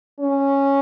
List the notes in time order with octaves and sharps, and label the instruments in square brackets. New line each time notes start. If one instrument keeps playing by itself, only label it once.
[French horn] C#4